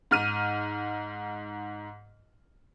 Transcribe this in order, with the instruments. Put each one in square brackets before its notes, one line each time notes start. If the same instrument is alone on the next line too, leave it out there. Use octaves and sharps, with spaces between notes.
[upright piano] G#2 F6 D#7